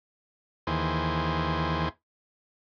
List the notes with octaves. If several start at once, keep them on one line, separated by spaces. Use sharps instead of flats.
D#2 E3 G#4 C5